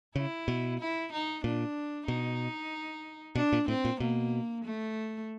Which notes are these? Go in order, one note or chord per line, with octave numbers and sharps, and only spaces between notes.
C#3 E4
B2
E4
D#4
A#2 D4
B2 D#4
B2 D4
A#2
A2 C4
A#2
B2 A#3
A3